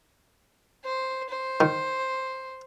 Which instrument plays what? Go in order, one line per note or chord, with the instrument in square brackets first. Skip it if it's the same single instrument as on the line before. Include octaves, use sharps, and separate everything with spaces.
[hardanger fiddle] C5
C5
[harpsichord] D#3